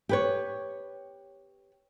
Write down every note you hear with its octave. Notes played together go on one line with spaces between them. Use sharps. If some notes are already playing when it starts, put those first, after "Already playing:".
G4 B4 C#5